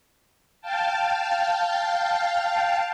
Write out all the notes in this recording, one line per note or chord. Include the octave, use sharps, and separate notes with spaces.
F5 G5 A5